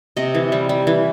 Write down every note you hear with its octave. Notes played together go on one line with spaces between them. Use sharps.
C3 D#5
E3
G3
G3
E3